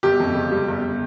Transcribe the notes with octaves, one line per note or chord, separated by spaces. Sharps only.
G1 G4
F2
C#3
G3
G1